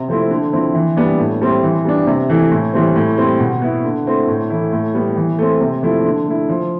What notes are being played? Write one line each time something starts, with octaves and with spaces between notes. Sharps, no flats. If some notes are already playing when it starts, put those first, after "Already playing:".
Already playing: C3
F3 A3 C4 E4
D3
F3 C4 E4
E3
G3 B3 D4
A2
G3 C4 E4
E3
G3 B3 D4
C3
E3 A3 E4
A2
E3 G3 C4
A2
G3 C4 E4
B2
B3 E4
D3
A3 C4 E4
A2
E3 A3 E4
A2
G3 B3
E3
A3 C4
C3
F3 A3 E4
D3
A3 E4
F3